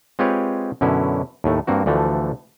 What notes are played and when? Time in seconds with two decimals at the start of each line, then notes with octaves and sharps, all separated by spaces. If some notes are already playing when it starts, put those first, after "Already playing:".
0.19 G#3 C4 F4 G4 B4 C#5
0.81 F#2 B2 D3 C#4 E4
1.44 D#2 A2 A3
1.67 G2 A#3 C4 F#4
1.86 D2 D3 E3 F3 A3